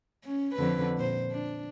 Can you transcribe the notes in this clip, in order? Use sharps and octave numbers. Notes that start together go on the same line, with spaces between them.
C#4
F2 D3 B4
A#2 C5
D4